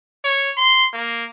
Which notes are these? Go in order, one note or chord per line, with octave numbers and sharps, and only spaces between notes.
C#5
C6
A#3